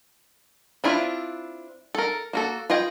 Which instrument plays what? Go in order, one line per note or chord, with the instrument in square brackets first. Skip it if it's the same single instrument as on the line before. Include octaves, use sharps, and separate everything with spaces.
[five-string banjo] C4 D4 E4 F4
A4 A#4
A#3 F#4 A4
F4 G#4 D#5 G5